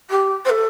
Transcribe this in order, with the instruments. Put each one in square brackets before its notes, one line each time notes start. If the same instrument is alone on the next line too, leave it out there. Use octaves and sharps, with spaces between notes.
[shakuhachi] G4
C5
A4